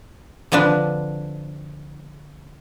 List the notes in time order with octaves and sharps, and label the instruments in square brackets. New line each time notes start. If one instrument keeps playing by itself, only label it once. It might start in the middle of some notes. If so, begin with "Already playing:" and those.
[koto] D3 F3 C4 D4 B4